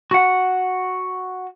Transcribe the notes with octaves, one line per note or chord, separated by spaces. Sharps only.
F#4 F#5